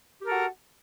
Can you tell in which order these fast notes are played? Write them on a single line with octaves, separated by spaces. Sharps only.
G4 A#4 A4 F#4